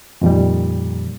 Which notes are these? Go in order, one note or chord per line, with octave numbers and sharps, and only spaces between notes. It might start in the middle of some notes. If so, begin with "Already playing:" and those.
F2 A#2 D#3 G3